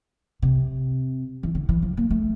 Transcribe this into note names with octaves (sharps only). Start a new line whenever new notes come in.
C3
E3
D3
E3
F3
A#3
A3